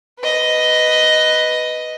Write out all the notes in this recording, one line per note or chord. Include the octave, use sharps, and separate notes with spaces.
B4 D#5